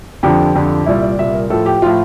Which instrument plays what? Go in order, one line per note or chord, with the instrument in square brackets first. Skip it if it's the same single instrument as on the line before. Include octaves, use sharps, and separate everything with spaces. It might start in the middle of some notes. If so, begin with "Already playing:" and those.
[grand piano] F2 D3 F3 G4
F2 D3 F3
C2 A#2 G3 E4
D5
C2 A#2 G3 E5
A#4
A2 F3 A4
G4
A2 F3 F4